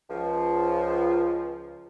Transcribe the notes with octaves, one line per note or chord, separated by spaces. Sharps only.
C#2 F3